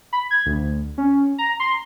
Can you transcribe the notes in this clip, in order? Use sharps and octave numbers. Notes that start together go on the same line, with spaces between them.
B5
G#6
D2
C#4
A#5
C6